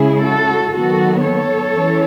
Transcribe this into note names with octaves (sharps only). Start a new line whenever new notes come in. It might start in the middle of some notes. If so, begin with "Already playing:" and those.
Already playing: C#3 G#3 C#4 E4 G#4
F#4 A4
D#3 F#3 B3 F#4 A4
A4 C#5
E3 G#3 C#4 E4